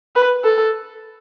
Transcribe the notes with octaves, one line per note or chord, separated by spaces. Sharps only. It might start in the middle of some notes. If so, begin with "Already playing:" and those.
B4
A4